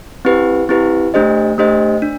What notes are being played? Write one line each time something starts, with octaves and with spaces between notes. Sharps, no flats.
C4 E4 G4 B4
C4 E4 G4 B4
A3 D4 G4 C5 D#5
A3 D4 G4 C5 D#5
D4